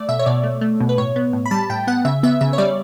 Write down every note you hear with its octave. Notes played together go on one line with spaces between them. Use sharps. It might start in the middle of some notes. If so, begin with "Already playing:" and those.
Already playing: A3 D5
B2 E5
C#5
B2 D5
A3
A3
B2
B4
A2 C#5
B3
A2
B5
G3 A5
A2 G5
B3 F#5
C#3 E5
B3 E5
C#3 E5
C#5
G3 D5